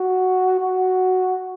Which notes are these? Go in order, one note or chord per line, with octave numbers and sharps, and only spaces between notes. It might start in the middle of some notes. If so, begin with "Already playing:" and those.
Already playing: F#4
F#4